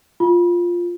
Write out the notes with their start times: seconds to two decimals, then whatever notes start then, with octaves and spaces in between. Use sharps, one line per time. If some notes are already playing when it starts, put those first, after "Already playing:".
0.20 F4